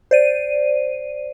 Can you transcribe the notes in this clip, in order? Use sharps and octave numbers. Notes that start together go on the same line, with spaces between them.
C5 D5 D#7